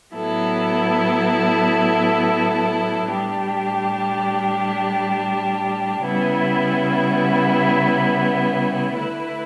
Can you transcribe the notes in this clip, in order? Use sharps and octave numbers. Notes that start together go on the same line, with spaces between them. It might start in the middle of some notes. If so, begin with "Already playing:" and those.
A2 F#3 B3 E4 A4
A2 G3 D4 G4
C#3 G3 B3 E4
D3 A3 E4 B4